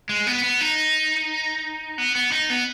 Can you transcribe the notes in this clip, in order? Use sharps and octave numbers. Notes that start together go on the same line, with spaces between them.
G#3
B3
B3
D#4
B3
B3
D#4
B3